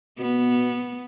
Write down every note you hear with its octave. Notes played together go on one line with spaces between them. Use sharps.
B2 B3